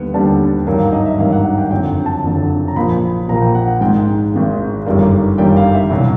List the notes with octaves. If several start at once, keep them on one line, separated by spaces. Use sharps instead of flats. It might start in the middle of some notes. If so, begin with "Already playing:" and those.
Already playing: D#2 D3 G3 B3
D#2 D3 G3 B3 A5
G#1 G2 D#3 F#3 A#3 G5
F5
D#5
E5
G#1 G2 D#3 F#3 A#3 F5
F#5
F#5
G5
F#1 F2 D3 F#3 G5
A5
F#1 F2 D3 F#3
A#5
A#1 A#2 F3 A#3 B5
A#1 A#2 F3 A#3 A#5
G5
F#5
F#5
G#1 G#2 D#3 G#3 G5
G#1 G#2 D#3 G#3
G1 F#2 D#3 G3 A#3
G1 F#2 D#3 G3 A#3 G5
F5
E5
C2 B2 F#3